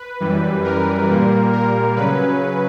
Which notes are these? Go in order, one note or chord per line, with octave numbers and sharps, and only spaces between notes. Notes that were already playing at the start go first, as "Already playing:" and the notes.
Already playing: B4
F#2 E3 G3
A#4
A#2 G3 A#3
A#4
C#3 F#3 C#4 B4